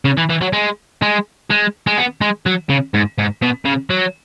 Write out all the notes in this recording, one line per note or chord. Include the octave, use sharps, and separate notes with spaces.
C#3
E3
E3
F#3
G#3
G#3
G#3
G#3
B3
G#3
F#3
C#3
G#2
G#2
B2
C#3
F#3